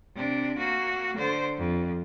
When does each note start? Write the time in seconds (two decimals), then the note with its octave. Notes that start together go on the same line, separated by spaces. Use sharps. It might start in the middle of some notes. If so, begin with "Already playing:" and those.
0.16 C3 D4
0.58 A#3 F#4
1.17 D3 C5
1.58 F2